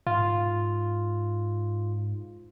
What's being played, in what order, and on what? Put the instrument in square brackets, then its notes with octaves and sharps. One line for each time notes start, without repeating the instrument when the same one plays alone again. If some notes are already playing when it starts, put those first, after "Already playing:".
[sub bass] G#2 [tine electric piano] F4